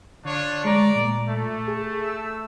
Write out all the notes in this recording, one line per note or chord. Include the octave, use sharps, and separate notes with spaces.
D3 D4 F4 C#5
G#3 D5 A#5
A#2
A3
G#4
E6